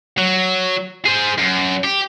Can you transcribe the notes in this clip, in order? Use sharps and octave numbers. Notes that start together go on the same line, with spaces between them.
F#3
G#4 C5
F#2
G4